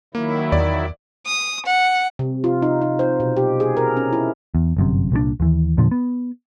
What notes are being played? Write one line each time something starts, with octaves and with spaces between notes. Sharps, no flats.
D#3 F#3 A#3 E4
E2 D5
D#6
F#5
C3
F4
D#4
D#4
C5
B2
G4
G#4
A#4
C#4
E4
E2
G1 F#2 C3
C2 A#2 F3 D4
D#2 E3
E2 A#2 D3 F3
B3